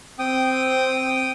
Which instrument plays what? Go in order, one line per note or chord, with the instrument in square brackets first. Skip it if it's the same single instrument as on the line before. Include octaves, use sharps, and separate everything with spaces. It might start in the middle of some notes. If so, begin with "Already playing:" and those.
[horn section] C4 [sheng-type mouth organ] G5 D#6